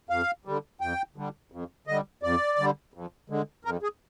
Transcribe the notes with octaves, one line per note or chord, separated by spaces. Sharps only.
F2 F5
D3 G3
F2 G5
D3 G3
F2
D3 G3 D#5
F2 D5
D3 G3
F2
D3 G#3
F2 A#4
G#4